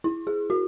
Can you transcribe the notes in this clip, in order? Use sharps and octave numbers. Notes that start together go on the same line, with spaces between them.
E4
G#4
F#4